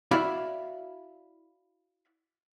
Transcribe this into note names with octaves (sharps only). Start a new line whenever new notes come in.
E4 F#4 D5 E5 F5 B5